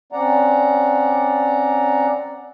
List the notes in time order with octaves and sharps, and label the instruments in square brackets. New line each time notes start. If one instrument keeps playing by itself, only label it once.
[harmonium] C4 C#4 D5 F#5 A#5